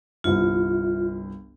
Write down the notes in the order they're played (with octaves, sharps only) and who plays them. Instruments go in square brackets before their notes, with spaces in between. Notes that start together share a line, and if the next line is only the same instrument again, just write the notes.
[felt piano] G1 C2 [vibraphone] F4